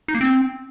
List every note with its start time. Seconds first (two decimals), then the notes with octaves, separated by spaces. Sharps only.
0.08 D#4
0.15 A#3
0.21 C4